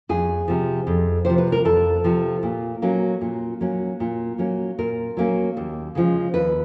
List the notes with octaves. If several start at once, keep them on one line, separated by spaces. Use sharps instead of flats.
F2 G#4
C3 F3
F2
C3 F3 C5
B4
A#4
F2 A4
C3 F3
A#2
F#3 A#3 C#4
A#2
F#3 A#3 C#4
A#2
F#3 A#3 C#4
A#2 A#4
F#3 A#3 C#4
D#2
C#3 F3 G#3
D#2 B4